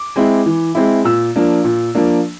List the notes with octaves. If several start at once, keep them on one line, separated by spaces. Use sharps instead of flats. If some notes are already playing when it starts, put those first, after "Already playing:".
Already playing: D6
G#3 C4 E4
E3
G#3 C4 E4
A#2 E6
F3 A#3 D4
A#2
F3 A#3 D4